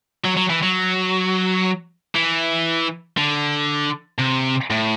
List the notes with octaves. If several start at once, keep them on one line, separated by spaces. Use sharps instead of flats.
F#3
F#3
E3
F#3
E3
D3
C3
A2